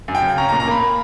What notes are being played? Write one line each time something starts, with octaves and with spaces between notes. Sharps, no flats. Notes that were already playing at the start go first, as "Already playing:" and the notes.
F#2
G5
C#3
C#4 A#5
A#5
A#2
A#5
A#3 B5